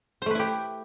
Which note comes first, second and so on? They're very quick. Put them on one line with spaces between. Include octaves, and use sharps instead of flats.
C5 A3 B4 E4 G4